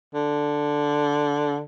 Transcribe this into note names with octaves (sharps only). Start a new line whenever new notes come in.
D3